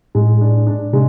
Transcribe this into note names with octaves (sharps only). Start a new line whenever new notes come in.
A2 G#3
D4
D4
C3 G#3